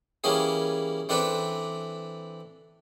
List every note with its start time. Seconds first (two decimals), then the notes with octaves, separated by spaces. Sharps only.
0.24 E3 G3 A#3 C#4 E4 G#4
1.09 E3 C4 D4 A4 B4 D5